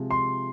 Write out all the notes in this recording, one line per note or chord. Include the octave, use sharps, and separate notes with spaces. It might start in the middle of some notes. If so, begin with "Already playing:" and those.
Already playing: C3 F3 G#3
C6